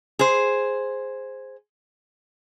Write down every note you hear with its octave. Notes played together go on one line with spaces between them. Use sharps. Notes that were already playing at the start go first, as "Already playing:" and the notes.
G#4 C5